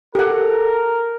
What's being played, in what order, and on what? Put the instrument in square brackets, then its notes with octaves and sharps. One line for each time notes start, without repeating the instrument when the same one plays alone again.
[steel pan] G4 F#5 [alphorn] A4 [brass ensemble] A#4